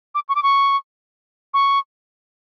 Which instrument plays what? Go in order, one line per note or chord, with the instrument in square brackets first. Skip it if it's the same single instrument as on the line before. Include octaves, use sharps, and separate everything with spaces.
[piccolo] D6
C#6
D6
C#6
C#6